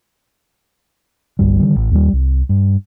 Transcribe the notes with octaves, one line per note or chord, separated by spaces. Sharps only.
G1 C2 G2 G3
D3 D#3 F3 G3
A1
D#2 G3
C2
G2